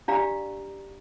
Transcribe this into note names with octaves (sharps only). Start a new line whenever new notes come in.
D4 G4 D5 F5 A#5